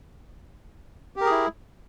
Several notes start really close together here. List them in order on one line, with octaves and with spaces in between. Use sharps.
G4 A#4 G#4 E4